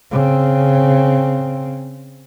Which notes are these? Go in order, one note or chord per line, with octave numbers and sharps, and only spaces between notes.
C#3 C4